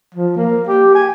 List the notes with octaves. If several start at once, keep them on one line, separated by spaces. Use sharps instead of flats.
F3
A#3
G4
G#5